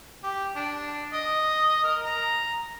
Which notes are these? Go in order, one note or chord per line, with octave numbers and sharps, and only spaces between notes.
G4
D4
D#5
A#4
A#5